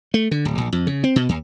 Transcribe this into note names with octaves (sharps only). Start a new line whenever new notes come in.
A3
D3
D1
A#1
F2
C#3
C4
B2
D#2